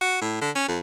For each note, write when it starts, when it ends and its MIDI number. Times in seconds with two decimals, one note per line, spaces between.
0.01 0.18 66
0.21 0.41 45
0.41 0.50 50
0.55 0.68 61
0.68 0.79 41